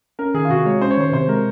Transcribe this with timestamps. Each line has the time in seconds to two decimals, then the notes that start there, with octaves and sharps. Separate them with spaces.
0.19 C#4 A#4
0.34 D#3 G#4
0.45 F4
0.50 C3 F#4
0.66 G#3 C#5
0.81 C#4 C5
0.91 C#5
0.97 D#3 C5
1.13 C3 C5
1.29 G#3 A#4